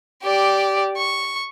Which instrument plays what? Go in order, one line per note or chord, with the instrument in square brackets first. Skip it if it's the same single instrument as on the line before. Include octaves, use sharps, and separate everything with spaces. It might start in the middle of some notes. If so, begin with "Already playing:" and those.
[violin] G4 D5
C#6